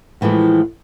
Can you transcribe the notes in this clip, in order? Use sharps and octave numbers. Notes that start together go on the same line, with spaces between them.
A2 E3 F3 G#3 A3